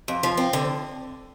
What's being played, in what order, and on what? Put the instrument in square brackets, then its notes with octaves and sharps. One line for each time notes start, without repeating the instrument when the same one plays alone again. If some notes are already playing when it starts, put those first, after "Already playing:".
[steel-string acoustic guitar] F2
F3
C4
D3